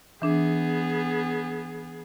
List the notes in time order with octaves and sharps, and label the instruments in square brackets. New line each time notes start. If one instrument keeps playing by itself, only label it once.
[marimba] E3 D4 [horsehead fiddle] B3 G#4